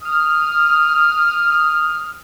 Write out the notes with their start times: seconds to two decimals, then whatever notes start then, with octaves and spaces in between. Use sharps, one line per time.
0.03 D#6 F6